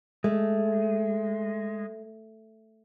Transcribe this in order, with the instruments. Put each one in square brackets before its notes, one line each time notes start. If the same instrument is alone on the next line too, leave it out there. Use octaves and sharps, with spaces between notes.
[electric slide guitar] G#3 [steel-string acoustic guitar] A3